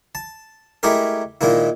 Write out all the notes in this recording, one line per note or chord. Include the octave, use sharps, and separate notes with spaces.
A5
G#3 A3 E4 G4 G#4 A#4
A#2 D#3 G#3 A#3 E4